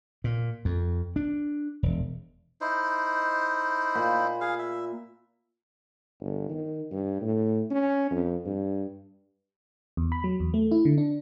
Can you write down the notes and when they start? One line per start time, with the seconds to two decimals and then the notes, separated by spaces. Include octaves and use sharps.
0.24 A#2
0.65 F2
1.16 D4
1.83 E1
2.61 D#4 E4 C5
3.95 A#2 B5
4.41 G#4 F5
4.59 E5
6.20 G1
6.50 D#3
6.91 G2
7.21 A2
7.70 C#4
8.11 F2
8.46 G2
9.97 E2
10.12 B5
10.24 F#3
10.40 E2
10.54 A3
10.71 E4
10.85 D3
10.98 D4